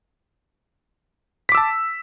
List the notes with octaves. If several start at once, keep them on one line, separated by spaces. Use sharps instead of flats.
A5 D6 E6 B6